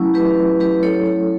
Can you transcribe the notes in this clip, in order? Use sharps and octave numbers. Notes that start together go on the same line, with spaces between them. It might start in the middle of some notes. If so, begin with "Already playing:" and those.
Already playing: F#3 A3 C#4 E4
G4 B4
G4 B4
A4 C#5
A4 C#5